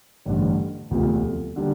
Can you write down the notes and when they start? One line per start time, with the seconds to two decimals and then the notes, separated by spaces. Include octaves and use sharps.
0.25 A1 G2 D3
0.91 E1 D2 C3 F3
1.56 D3 G3 A#3